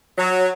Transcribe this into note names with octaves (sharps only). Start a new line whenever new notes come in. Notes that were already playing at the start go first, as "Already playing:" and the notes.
F#3